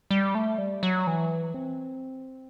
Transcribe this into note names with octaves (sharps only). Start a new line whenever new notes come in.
G3
A3
G3
F#3
E3
C4